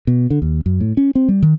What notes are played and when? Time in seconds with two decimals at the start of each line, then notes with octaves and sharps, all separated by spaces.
0.07 B2
0.30 D3
0.42 D#2
0.66 F#2
0.81 A2
0.97 C#4
1.15 C4
1.29 G3
1.43 D#3